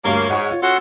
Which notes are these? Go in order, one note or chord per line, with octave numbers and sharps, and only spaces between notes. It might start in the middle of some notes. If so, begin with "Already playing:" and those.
D2 G2 A#3 C#5
G#2 F#5 C#6
F4
C#4 F#4 A4 F#5 C6